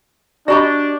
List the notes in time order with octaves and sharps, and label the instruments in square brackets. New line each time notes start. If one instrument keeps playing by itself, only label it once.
[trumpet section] D4 [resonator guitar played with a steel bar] F#4 G4 D#5 [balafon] D5 A#5 B5